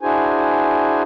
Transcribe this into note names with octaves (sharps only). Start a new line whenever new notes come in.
D4 E4 F#4 G#4 C5 G#5